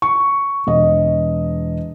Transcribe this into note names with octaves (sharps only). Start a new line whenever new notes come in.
C#6
E1 D#5